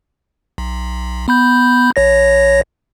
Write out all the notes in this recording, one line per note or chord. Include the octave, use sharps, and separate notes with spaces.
B1
B3 B5 G6
A#1 C#5 A#6